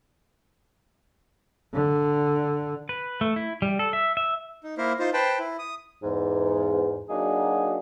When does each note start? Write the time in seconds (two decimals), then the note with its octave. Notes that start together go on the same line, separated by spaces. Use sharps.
1.73 D3
2.89 B4
3.21 A3
3.36 E4
3.62 G3
3.79 A4
3.93 E5
4.17 E5
4.64 D#4
4.78 A#3 E4 A#4 C5
4.99 D#4 F4 C5
5.14 B4 C5 G5 A5
5.39 E4
5.59 D#6
6.03 E2 G#2
7.09 F#3 A#3 D4 D#4 F#4 G#4